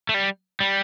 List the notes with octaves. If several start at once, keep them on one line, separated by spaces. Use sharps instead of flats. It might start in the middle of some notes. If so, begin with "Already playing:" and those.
A3
G3
G3